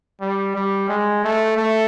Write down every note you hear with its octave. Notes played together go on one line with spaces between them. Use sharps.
G3
G3
G#3
A3
A3